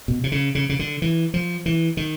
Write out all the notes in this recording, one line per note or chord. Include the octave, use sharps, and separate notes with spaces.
B2
C3
C#3
C#3
C#3
D3
E3
F3
E3
D#3